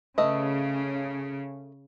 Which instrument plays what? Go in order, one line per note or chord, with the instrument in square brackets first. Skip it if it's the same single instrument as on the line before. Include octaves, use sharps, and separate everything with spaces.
[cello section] C#3 [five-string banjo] A3 B4 D#5